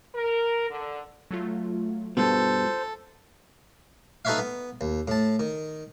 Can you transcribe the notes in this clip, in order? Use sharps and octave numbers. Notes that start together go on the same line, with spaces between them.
A#4
D3
F#3 A3 F4
G2 B2 F4 A4 C5
D#4 A4 B4 C#5 E5 F5
B3
D#2
A2 A5
D#3